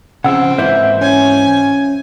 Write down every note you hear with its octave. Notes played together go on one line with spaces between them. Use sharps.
C#3 E3 F3 C4 F#5 E6
G#2 E3 A#3 C5 E5
C#4 G#5